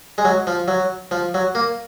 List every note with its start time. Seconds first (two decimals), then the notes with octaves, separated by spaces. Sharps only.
0.18 G#3
0.25 F#3
0.47 F3
0.68 F#3
1.11 F3
1.34 F#3
1.55 A#3